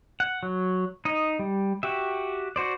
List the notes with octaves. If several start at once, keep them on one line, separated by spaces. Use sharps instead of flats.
F#5
F#3
D#4 D#5
G3
F#4 G4 E5
F#4 C5 D5